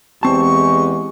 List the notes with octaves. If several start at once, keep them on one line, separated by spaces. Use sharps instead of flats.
E2 G#3 C4 G4 A5 C#6